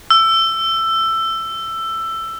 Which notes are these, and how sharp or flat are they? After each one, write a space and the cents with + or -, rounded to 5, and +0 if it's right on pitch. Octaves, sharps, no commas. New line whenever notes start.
E6 +15